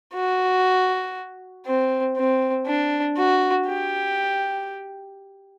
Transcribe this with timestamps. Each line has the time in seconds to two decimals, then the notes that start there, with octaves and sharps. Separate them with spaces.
0.14 F#4
1.67 C4
2.17 C4
2.67 D4
3.17 F#4
3.68 G4